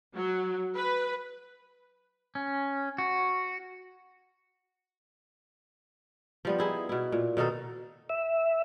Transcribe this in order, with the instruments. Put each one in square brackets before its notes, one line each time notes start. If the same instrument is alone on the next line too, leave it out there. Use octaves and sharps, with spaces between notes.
[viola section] F#3
B4
[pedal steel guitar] C#4
F#4
[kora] F3 G3 B3
D#4 E4 G#4
B2 E4
A#2
B2 D#3 D#4 A4
[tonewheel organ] E5